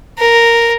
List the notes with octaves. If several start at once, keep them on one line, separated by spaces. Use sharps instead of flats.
A#4